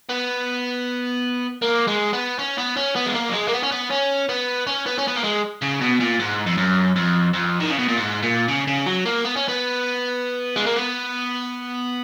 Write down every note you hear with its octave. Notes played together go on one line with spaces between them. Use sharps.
B3
A#3
G#3
B3
C#4
B3
C#4
B3
G#3
A#3
F#3
G#3
A#3
B3
C#4
B3
C#4
B3
C#4
B3
C#4
B3
A#3
G#3
C#3
B2
A#2
G#2
F2
F#2
F2
F2
D#3
C#3
B2
A#2
G#2
A#2
C#3
C#3
F#3
A#3
B3
C#4
B3
G#3
A#3
B3